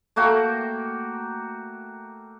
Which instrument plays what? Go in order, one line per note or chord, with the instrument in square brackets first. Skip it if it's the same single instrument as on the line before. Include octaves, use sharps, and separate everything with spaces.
[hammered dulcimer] A3 A#3 F#4 G5